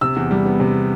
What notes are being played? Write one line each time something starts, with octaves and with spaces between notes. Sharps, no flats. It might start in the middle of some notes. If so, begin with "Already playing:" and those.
C3 E6
E2
G3
B3
C3